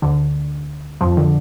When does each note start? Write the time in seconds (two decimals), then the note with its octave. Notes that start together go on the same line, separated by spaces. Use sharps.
0.02 D2 D3
1.01 F2 F3
1.17 D3